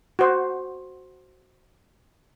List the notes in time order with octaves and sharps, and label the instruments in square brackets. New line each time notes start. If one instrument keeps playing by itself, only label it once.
[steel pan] F#4 C5